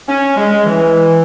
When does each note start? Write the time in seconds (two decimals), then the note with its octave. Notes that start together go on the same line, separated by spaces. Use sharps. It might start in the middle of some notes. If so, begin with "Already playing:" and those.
0.08 C#4
0.37 G#3
0.65 E3